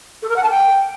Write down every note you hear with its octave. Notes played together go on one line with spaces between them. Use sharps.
A4
A#4
F#5
A5
G5